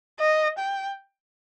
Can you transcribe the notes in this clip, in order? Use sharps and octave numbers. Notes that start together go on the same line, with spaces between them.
D#5
G5